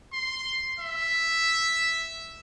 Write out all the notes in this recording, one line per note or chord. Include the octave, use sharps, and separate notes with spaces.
C6
E5